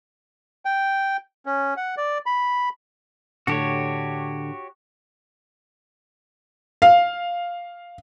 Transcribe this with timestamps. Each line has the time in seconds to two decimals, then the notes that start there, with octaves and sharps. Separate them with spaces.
0.65 G5
1.46 C#4
1.77 F#5
1.97 D5
2.26 B5
3.47 A2 D3 D4 F#4 G4 C#5
6.82 F5